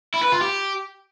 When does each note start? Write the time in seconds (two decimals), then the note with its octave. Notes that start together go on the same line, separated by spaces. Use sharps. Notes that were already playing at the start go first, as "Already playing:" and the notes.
0.14 E4
0.23 B4
0.32 F4
0.41 G4